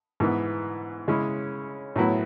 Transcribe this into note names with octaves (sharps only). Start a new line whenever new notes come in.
G#2 E3 B3
C#3 G#3 C#4 E4
A2 F#3 B3 E4